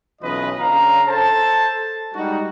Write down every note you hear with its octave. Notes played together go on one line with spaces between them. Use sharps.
B1 E3 C#4 F4 B4 D#5
C#3 D4 C#5 F5 A#5
A4 C5 A5
G3 G#3 D#4 F#4